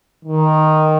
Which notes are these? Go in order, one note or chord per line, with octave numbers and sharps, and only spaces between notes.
D#3